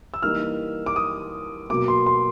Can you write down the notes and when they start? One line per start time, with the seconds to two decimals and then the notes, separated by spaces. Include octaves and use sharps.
0.14 E6
0.22 E3 G3 A#3 D#4 F6
0.86 D6
0.96 D#6
1.70 B2 F#3 A#3 D6
1.88 C6
2.06 C6